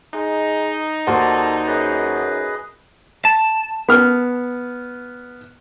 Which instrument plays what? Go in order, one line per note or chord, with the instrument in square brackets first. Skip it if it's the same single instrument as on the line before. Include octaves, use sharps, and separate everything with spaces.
[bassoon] G#3 [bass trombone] D#4
[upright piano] D#2 F#4 C5 [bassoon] A4 [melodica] D5
[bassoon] F#2 [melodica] G#4 B4 D#5
[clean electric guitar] A5
[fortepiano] B3 F6